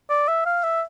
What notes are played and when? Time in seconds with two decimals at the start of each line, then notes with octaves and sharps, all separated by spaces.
0.10 D5
0.28 E5
0.46 F5
0.63 E5